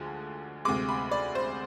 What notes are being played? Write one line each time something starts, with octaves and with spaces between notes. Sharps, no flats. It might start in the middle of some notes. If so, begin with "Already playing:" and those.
Already playing: D2 D3 F3 G#3
D2 C3 G#3 D6
B5
D5
C5